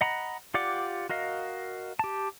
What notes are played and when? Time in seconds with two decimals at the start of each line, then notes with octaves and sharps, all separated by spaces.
0.01 D#5 F#5 A#5 B5
0.54 F4 G4 D5 F#5 D6
1.09 F#4 A#4 D#5 F5
1.99 G4 A5